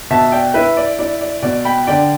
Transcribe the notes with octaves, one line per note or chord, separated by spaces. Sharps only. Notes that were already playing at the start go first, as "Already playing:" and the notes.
B2 E5 A5
D5 G5
E4 B4 E5
D5
E4 D5
D5
B2 D5
G5 B5
D3 D5 G5